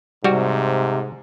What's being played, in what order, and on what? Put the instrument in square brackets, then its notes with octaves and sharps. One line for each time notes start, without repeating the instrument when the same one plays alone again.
[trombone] G#2 [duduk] C3 [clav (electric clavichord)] G3 F#4